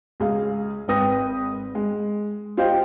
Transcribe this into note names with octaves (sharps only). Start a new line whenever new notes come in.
C#2 G#4 F5
G#1 C4 B4 G5 D#6 A#6
G#3
F4 G4 C5 D#5 F5 G5